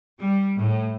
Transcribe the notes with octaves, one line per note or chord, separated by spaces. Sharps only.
G3
A2